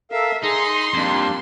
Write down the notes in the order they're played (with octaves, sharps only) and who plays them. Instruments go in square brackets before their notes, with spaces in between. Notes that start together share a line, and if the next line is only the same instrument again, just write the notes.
[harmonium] A4 A#4 F5 [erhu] E5
[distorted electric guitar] D#4 [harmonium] G#4 [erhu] C6
[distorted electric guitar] F2 [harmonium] G3 A#3 D4